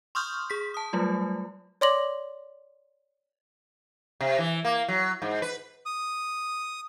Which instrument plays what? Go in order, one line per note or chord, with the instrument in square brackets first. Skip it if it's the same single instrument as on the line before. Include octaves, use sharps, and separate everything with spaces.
[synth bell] C6 C#6 D#6 F6 G6
G#4 B6
A5 D#6
F#3 G3 A3 F4
[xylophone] C#5 D5 C6 D6 A#6 F#7
[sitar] C3
E3
A#3
F#3
G#2
B4
[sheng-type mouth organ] D#6